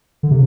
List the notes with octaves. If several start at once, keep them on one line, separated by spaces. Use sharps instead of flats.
D3
C3